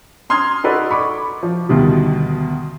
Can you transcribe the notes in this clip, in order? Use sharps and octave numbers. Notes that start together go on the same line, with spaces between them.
A#5 C6 D#6 F6 G#6
D#4 F#4 A4 B4 D5
B5 C#6 D6
F3
D2 B2 D#3 G3